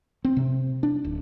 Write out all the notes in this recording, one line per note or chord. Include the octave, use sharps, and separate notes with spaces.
C4
C3
D4
D1